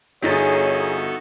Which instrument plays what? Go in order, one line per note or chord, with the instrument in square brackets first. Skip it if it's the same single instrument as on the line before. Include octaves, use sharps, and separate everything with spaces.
[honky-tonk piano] G1 D#4 A6 [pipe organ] B3 F#4 A4 [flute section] G#4 [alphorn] C#5